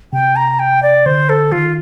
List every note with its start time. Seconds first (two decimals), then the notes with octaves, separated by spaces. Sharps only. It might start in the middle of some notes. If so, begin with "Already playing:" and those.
0.13 C3 G5
0.36 A#5
0.59 G5
0.83 D5
1.06 D3 C5
1.29 A4
1.52 D#3 F4